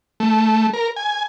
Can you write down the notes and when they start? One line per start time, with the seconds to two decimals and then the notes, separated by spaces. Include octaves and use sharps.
0.20 A3
0.73 A#4
0.96 G#5